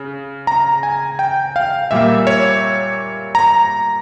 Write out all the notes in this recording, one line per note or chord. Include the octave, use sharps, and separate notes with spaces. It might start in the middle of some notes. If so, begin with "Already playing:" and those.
Already playing: C#3
A#5
G#5
G5
F5
A#2 G3 A#3 E5
C#5
A#5